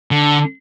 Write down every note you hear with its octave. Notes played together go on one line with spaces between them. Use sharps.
D3